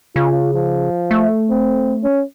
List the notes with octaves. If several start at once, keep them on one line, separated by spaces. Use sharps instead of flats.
C#3 F4
F3
A3
C4
C#4